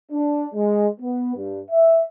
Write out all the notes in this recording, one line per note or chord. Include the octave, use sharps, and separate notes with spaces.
D4
G#3
B3
G2
E5